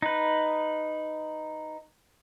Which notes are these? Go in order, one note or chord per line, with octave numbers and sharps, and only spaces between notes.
D#4 B4